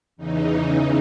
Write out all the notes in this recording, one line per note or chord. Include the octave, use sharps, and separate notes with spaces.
E2 C#3 E3 D#4